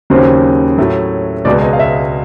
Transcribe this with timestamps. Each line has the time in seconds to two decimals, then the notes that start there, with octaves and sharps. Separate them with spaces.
0.10 D#2 C#3 F#3 C5
0.78 A2 F#3 A3
1.45 C#2 B2 G#3 D5
1.62 D#5
1.73 F5
1.79 E5